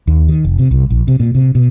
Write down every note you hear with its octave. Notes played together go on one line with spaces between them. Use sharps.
D#2
D#3
F1
C3
C2
A#1
C3
A#2
C3
B2